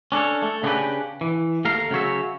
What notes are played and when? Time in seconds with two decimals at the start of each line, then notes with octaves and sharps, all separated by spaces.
0.12 C#4 D4 A4 C#5
0.43 A3
0.63 C#3 B3 C#4 D4 G4 B4
1.21 E3
1.65 D#2 A3 A#4 F5
1.91 C#3 F#3 C#5 E5